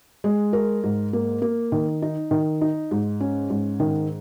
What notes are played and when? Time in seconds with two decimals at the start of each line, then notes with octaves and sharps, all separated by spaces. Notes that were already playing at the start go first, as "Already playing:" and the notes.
0.24 G#3
0.53 A#4
0.83 G#2
1.13 A#3
1.42 A#3
1.72 D#3
2.02 D#4
2.31 D#3
2.61 D#4
2.91 G#2
3.20 C#4
3.50 G#2
3.80 D#3